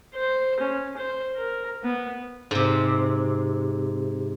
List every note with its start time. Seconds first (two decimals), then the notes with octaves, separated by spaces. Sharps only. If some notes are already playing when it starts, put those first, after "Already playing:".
0.15 C5
0.60 C#4
0.97 C5
1.36 A#4
1.83 B3
2.51 G#2 C3